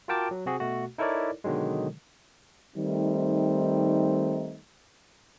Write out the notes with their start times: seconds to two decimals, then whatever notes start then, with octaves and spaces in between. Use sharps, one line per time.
0.08 F4 F#4 A#4 G5 A5 D6
0.31 F#3
0.46 C3 C4 F#4 G#4
0.60 B2 A3 F#4
0.98 D#4 E4 A4 A#4 C#5 D5
1.44 B2 D3 D#3 F#3 G#3
2.76 D#3 G3 A3 C4 D#4